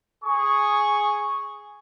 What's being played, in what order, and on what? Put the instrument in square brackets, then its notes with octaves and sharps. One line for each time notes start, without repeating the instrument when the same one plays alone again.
[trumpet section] G#4 C#6